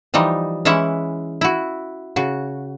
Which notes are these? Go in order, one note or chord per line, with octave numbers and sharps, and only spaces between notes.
E3 F3 G3 D#4
E3 G#3 C#4 E4 E5 F#5
E4 F#4
C#3 F#4